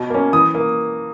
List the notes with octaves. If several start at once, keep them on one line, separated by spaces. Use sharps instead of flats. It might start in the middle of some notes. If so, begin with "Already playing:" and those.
Already playing: B2
A#3 C#4
E3 D#6
A#3